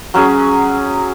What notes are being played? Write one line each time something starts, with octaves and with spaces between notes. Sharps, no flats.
F#3 C#4 G#4